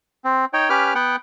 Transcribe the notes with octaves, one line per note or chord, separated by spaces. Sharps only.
C4
D#4 C#5 G5
C#4 G4 B4 D6 F6
B3 F#5 G5